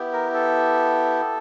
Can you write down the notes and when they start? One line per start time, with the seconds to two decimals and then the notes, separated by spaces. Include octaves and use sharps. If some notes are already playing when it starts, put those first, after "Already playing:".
Already playing: B3 E4 G4
0.13 A#4
0.34 A4